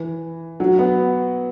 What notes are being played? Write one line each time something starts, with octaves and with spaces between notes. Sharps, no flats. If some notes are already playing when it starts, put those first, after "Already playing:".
Already playing: E3
F#3
B3